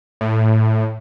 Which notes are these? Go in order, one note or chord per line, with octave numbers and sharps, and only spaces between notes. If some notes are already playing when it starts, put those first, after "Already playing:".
A2